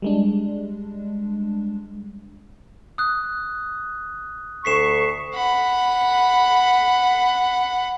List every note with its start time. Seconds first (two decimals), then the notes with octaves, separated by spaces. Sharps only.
0.02 G3 G#3 D4
2.98 D#6 F#6
4.65 D2 C#6 B6 C7 E7
5.35 F#5 B5